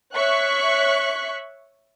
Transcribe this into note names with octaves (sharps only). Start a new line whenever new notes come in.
C#5 E5 C#6 F#6 B6